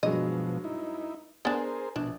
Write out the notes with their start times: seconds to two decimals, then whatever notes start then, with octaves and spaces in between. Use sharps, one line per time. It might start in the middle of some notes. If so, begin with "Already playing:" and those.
0.03 G2 B2 F3 F#3 G#3 D#5
0.64 D#4 E4
1.45 B3 D4 G#4 A#4 C5 G#5 A6
1.96 A#1 B2 D4